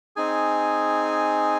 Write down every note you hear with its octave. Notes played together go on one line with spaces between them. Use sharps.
C4 D#4 G#4 G#5